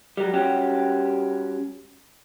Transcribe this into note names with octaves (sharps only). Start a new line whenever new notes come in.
F#3 G3
G3 C#4 F#4 G4